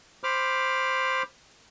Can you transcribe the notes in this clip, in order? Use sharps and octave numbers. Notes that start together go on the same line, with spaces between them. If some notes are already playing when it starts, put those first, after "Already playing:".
C5 B5 D6 F6